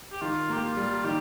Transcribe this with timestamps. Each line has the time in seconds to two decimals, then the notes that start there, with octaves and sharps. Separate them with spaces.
0.12 G4
0.21 D#3 F4
0.49 A#3 G4
0.63 F4
0.77 G3
1.04 D#3 G4